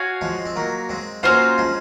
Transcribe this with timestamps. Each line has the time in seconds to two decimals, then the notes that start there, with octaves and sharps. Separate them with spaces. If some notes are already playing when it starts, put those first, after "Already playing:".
Already playing: F#4 C#5 F5 G#5
0.21 F3 G#3
0.46 C4
0.56 F#3 A#3
0.89 G#3 C4
1.23 F#3 A#3 C#4 F4 C5 F5
1.58 F3 G#3